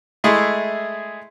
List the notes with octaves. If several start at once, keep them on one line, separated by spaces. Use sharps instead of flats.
G#3 A3 E4 G#4